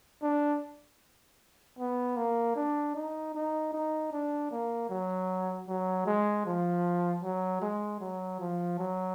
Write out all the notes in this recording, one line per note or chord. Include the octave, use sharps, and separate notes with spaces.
D4
B3
A#3
D4
D#4
D#4
D#4
D4
A#3
F#3
F#3
G#3
F3
F#3
G#3
F#3
F3
F#3